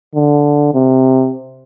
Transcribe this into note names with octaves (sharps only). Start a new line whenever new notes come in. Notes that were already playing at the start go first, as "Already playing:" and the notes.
D3
C3